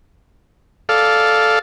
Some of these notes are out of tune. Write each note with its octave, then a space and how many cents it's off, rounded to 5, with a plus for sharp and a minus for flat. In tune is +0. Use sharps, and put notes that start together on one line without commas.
A4 -5 D5 +0 F5 +0